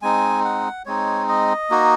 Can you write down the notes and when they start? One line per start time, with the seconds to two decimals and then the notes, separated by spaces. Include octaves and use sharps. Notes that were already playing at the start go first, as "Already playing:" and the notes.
0.02 G#3 C4 D#4 G#5
0.45 F#5
0.86 G#3 C4 D#4 C#5
1.29 D#5
1.70 A#3 D#4 F#4